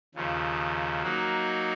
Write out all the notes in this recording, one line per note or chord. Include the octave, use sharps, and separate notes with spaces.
D#2 C#3 F3
F#3 A#3 D#4 F#4